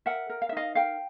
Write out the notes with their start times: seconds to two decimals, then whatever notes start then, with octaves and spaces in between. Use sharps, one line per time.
0.06 A#4 E5 F#5
0.30 A#4
0.42 F5
0.49 E5
0.52 D#4 D#5 F5
0.75 A#4 F5 G5